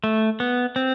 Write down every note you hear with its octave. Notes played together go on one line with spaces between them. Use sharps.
A3
B3
C4